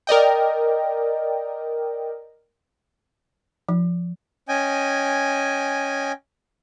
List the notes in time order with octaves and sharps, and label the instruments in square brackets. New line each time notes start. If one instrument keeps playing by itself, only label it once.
[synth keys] A#4 D5 D#5 G5
[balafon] F3
[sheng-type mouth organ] C#4 D#5 G5 G#5